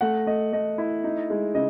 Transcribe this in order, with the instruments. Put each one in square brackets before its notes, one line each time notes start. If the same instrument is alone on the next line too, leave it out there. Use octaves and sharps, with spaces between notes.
[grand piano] A3 F#5
A3 D#5
A3 D#5
E4
D#4
G#3
C#3 D#5